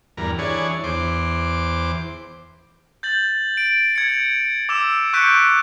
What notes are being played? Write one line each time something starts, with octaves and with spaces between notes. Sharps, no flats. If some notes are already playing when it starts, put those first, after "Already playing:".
E2 G2 A#4
E3 D4 G#4 C#5
E2 C5 D6
G6 A6 F#7
D7
G#6 C#7
D6 E6 E7
C#6 F#6 G6 B6 C#7 D7